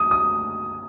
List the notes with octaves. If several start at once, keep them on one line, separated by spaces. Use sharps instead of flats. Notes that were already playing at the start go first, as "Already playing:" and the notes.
Already playing: D#6
D#6